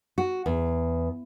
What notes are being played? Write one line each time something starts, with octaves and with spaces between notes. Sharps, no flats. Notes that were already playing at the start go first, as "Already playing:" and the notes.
F#4
E2